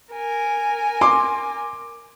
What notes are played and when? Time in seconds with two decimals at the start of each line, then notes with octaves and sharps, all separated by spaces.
0.12 A#4 G#5
1.01 C6 D6